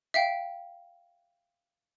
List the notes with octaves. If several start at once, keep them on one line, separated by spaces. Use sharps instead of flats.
E5 F5 G5